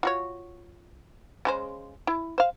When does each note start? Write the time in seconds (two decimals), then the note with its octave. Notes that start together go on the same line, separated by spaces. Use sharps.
0.03 F4 F#4 C#5
1.45 C#3 G#3 C5
2.07 E4
2.38 C5 F5